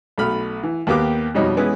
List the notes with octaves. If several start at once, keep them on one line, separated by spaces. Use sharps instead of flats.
B1 A3 B5 F6
E3
D#2 A#3 B3 G4 F5 D6
F2 B2 G3 D#4 C#5 D#5
E3 G#3 B3 C#4 E4